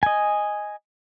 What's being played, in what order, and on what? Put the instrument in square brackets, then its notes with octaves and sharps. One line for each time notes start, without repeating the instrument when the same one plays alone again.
[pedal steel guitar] D#5 G#5